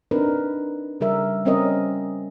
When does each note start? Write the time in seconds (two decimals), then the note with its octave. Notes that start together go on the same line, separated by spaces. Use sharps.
0.11 C4 D4 D#4 A#4 B4
1.00 C#3 G3 G4 A#4 E5
1.45 G3 C4 C#4 A#4 D#5